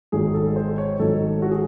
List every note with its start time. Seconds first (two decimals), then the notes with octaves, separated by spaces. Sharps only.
0.12 G#1 G#2 D#3 F#3 G#4
0.34 A4
0.56 C5
0.78 C#5
0.99 G#1 G#2 D#3 F#3 A4
1.42 F#4
1.51 G#4